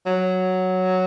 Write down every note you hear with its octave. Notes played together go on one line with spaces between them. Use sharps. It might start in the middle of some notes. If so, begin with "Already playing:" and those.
F#3